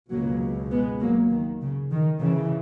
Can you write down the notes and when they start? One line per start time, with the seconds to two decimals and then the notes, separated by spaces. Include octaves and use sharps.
0.10 C#2 B2 F#3 A#3
0.71 G#3 B3
1.00 F#3 A#3
1.30 D#3
1.61 C#3
1.90 D#3
2.20 C#3 E3